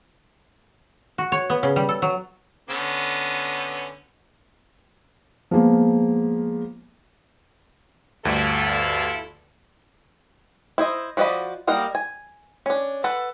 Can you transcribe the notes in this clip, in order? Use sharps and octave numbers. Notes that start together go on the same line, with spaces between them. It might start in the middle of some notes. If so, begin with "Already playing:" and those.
F#4
C#5
B3
C#3
G3
A4
F#3
D3 B3 C#4
F3 G#3 A#3 B3
D2 G2 E4 F4 A4
E4 C5 D#5
F3 F#4 D5 D#5 B5
G3 A#3 A#4 D#5 F#5
G#5
C#4 D4
A4 B4 F#5